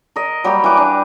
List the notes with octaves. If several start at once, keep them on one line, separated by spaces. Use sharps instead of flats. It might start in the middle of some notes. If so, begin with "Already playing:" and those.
A#4 D#5
F#3 G3 A#3 G4
E3 B4 D6
D4